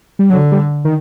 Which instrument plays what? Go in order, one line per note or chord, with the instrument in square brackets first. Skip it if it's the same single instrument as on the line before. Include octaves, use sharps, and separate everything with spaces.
[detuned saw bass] G3
[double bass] D3 [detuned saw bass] F#3
[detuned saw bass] G3
D#3